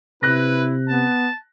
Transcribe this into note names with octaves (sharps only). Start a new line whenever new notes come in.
C3 E4 B4 F#6 A#6
B3 A5